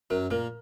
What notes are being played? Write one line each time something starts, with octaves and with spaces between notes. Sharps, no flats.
F#2 F#3 A#4
A#2 A#3 A#4